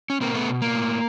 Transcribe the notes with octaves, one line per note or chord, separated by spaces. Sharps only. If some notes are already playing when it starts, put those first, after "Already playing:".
C#4
B2 A#3 C4
A3 B3
B2
A#3
A2